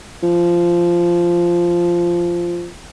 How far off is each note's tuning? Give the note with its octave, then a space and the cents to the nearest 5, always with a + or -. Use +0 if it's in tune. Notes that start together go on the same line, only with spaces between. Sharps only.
F3 -10